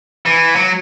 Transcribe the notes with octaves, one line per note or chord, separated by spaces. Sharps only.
E3
F#3